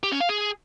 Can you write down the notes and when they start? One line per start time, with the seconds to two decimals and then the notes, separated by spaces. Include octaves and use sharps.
0.03 G4
0.12 C#4
0.20 F5
0.29 G#4